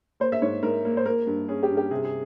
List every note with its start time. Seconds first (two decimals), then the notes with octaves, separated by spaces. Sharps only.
0.20 A#3 C5
0.32 E5
0.42 G#2 C#5
0.63 G#2 A#4
0.85 A#3
0.97 C5
1.05 A#3 A#4
1.27 G2
1.48 C#4 G#4
1.63 G4
1.70 G2
1.77 G4
1.91 C3 G#4
2.05 G#4